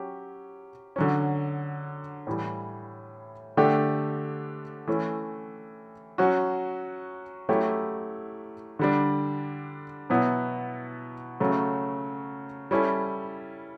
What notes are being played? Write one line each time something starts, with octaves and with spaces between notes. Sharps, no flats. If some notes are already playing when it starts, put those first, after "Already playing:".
Already playing: F#3 C#4 G4
D3 F#3 C#4
A2 E3 G3
D3 A3 D4 G4
E3 A3 C#4
F#3 C#4 F#4
F#3 A3 C#4 E4 G4
D3 G3 D4
B2 F#3 B3 E4
C#3 F#3 A3
G3 C#4 E4 A4